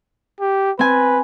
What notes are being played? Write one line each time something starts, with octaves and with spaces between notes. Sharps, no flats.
G4
C4 B4 G#5